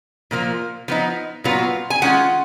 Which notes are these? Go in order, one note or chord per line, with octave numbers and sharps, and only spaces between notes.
A#2 F3 A#3 F4
F3 B3 D#4
A#2 F#3 B3 F4
G#5
D#3 G#3 C#4 F4 F#5